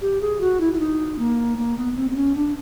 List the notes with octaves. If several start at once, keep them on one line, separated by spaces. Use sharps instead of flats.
G4
G#4
F#4
E4
E4
D#4
A#3
A#3
B3
C4
C4
C#4
D4